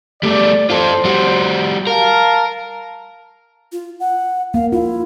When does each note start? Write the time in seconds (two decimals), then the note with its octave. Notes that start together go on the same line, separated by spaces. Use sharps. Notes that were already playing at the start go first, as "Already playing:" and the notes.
0.23 G3 A3 D5
0.70 F4 A4 C5
1.05 G3 F#4
1.87 A#4 F5 A5
3.72 F4
4.00 F#5
4.54 A#3 F5
4.72 E4 F4